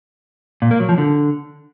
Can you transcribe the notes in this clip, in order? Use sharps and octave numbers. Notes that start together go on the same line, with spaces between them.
A#2
A#3
F#3
F3
D3